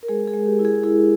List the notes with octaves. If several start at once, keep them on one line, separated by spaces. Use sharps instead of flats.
A#4
G#3 G#4
G#4
G#3
G4
E4
G#4
E4 G#4